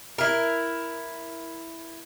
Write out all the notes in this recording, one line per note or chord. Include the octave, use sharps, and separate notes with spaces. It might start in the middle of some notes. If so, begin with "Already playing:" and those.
E4 A#4